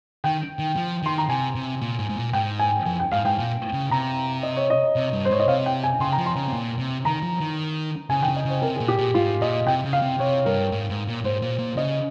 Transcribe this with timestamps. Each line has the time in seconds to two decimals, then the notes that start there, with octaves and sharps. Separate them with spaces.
0.24 D#3 G5
0.59 D#3
0.76 F3
1.03 D#3 C6
1.18 A#5
1.29 C3 G#5
1.55 C3
1.81 A#2
1.99 G#2
2.10 G#2
2.16 A#2
2.33 G#2 G5
2.59 G#5
2.86 F2 G#5
2.99 G5
3.12 G#2 F5
3.25 G#2 G5
3.38 A#2
3.73 C#3
3.91 C3 A#5
4.43 D#5
4.56 C#5
4.70 D#5
4.96 C3
5.13 G2
5.25 C5
5.31 G#2 C#5
5.40 D#5
5.48 C3 F5
5.66 G5
5.84 G#5
6.00 C#3 C6
6.12 A#5
6.18 F3
6.26 C6
6.36 C#3
6.48 C3
6.53 A#2
6.79 C3
7.05 D#3 A#5
7.22 F3
7.40 D#3
8.10 C#3 G#5
8.21 D#3 G5
8.27 C#3
8.36 D#5
8.45 C#3 C5
8.62 C3 A#4
8.76 G#4
8.80 A#2
8.88 G4
8.98 A#2
9.14 G#2 F4
9.41 A#2 D#5
9.67 C3 G5
9.85 C#3
9.93 F5
10.02 C3
10.20 C3 C#5
10.45 G2 A#4
10.72 G#2
10.90 G#2
11.07 A#2
11.24 G#2 C5
11.42 A#2
11.59 A#2
11.77 C#3 D#5